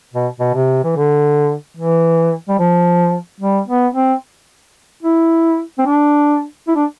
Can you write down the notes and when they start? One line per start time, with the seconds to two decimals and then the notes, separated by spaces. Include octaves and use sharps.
0.14 B2
0.40 B2
0.54 C3
0.84 E3
0.96 D3
1.77 E3
2.49 G3
2.59 F3
3.40 G3
3.68 B3
3.95 C4
5.03 E4
5.79 C4
5.86 D4
6.68 E4
6.76 D4